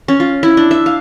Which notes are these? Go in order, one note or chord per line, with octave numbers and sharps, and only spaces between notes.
C#4
F4
E4
D4
E5
F5